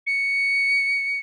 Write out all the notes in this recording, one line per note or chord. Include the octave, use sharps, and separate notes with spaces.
C#7